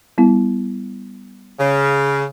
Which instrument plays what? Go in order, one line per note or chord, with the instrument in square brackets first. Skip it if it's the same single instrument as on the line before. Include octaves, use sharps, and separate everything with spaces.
[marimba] G3 B3 E4
[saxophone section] C#3